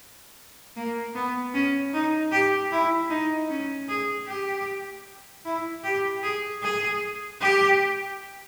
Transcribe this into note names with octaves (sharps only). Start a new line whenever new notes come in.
A#3
B3
C#4
D#4
G4
E4
D#4
C#4
G#4
G4
E4
G4
G#4
G#4
G4